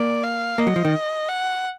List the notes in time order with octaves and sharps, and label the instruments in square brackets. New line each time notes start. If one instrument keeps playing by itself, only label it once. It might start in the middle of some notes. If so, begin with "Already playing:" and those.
Already playing: [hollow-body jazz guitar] A#3 [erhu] D5
[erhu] F5
[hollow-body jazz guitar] A#3 [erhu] D#5
[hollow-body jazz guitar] F#3
F3
D#3
[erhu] F#5